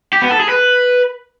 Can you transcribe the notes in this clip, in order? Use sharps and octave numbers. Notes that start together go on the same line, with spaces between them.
G4
B3
A4
G#4
B4